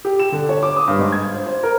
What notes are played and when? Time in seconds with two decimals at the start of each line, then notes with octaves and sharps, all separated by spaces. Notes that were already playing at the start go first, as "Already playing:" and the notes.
0.05 G4
0.20 E7
0.32 D3
0.49 C#5
0.63 D6
0.76 D#6
0.88 G2
0.99 G#2
1.12 G#6
1.34 C5
1.46 C5
1.63 A#4